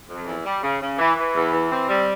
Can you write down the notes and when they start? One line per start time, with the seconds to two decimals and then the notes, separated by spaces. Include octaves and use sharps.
0.08 F2
0.26 E2
0.45 G3
0.62 C#3
0.80 C#3
0.99 E3
1.16 E3
1.35 E2
1.52 E3
1.70 C4
1.88 G3